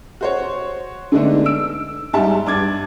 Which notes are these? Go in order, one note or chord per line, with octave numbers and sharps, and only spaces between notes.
F#4 C5 C#5
D3 G#3 A3 B3 D4 D#4
E6 D7
G#2 G3 G#3 E5 A5
G2 D6 G#6 A6